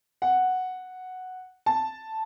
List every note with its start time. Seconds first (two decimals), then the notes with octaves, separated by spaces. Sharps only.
0.22 F#5
1.66 A5